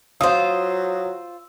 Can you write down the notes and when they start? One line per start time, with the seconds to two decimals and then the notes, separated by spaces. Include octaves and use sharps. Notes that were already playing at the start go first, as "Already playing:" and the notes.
0.21 F#3 F4 C5 F5 D#6 E6